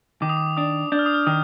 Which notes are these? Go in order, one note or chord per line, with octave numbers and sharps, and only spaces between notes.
D#3 D6
D#6
D6
D4 D#6
D4 G6
F6
D#6
F6
D#3 D#6